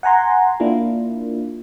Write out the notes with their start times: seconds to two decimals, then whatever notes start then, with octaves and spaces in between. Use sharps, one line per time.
0.03 F#5 G#5 A#5 C6
0.60 A#3 D4 E4 F4